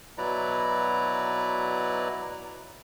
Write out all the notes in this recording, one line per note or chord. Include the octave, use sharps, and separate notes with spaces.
B2 F#3 E4 B4 D5 A#5